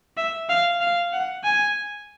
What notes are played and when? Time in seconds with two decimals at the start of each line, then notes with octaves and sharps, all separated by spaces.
0.17 E5
0.49 F5
0.81 F5
1.13 F#5
1.44 G#5